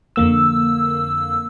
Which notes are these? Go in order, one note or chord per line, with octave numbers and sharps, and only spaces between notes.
F2 D3 A#3 E6